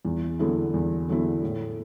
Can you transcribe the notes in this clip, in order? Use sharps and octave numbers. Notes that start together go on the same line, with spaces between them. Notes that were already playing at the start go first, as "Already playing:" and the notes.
E2
D3 F#3 B3 E4
E2
D3 F#3 B3 E4
A2